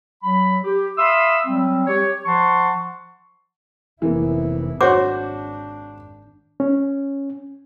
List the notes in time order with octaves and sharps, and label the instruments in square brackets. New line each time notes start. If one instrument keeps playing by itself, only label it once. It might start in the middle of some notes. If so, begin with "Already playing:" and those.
[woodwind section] F#3 B5
G4
E5 F5 B5 C6 D#6 E6
F#3 G3 C4
G4 C#5
F3 F#5 A5 C6 C#6
[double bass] F1 E4 [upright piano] E3 A#3 B3
[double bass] G#1 D4 [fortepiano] F#4 C5 [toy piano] C#5 D6 [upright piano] G6
[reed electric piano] C#4